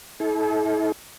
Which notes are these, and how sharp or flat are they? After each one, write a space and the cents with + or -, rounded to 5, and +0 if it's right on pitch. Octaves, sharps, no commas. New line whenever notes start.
E4 -45 A4 -40